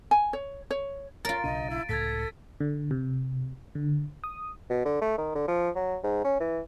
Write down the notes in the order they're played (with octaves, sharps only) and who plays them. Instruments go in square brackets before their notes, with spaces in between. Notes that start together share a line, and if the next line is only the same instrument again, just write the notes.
[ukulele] G#5
C#5
C#5
[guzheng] F4 A#4 [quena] C#5 [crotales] A6 D7
[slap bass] B1 C#3 D4 [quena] D#5 [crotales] D#7
[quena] E4
[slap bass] C#2 A2 [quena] A4 [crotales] G#6 A6 B6
[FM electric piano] D3
C3
D3
D#6
[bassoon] B2
D3
A3
D#3
D3
F3
F#3
G#2
C#4
E3